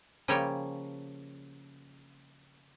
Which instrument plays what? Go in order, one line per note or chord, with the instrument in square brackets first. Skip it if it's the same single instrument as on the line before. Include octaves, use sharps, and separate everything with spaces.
[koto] C#3 F3 G3 A#3 C#5 G5